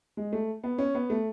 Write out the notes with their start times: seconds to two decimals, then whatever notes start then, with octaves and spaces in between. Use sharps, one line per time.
0.17 G#3
0.33 A3
0.63 B3
0.78 C#4
0.95 B3
1.10 A3